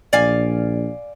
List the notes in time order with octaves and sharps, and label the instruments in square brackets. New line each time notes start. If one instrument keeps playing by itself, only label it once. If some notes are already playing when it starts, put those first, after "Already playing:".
[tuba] A#1 [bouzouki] D5 F5 G#5